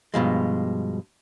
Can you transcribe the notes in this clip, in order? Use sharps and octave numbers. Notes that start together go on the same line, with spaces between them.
G2 B2 F3 G#3